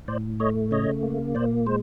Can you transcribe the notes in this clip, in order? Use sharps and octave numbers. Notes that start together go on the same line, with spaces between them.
A2 C5 D5
A3 C#5 D#5
C#3 C#5 D#5
A#3
A#2 C5 D5
G#3 C5